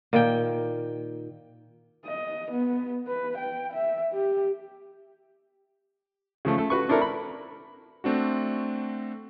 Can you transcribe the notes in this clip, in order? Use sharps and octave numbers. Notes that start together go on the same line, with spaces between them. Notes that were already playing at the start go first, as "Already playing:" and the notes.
A#2 D#3 G5
D#5
B3
B4
G5
E5
G4
C#3 F3 A3
A3 A4
F#4 B4 C#6
C4 D4 E4 A4 A#4
B5
A3 C4 D4 F#4